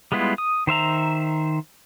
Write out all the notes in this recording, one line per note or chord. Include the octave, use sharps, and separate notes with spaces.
G3 G#3 B3 E4 F4
D#6
D#3 C5 E5 A#5